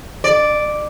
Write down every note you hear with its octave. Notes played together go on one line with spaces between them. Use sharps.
D5